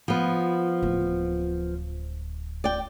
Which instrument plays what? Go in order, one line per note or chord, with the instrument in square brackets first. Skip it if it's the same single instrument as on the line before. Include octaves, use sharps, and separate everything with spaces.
[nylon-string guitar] F3 B3
[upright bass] D1
[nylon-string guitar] D5 G5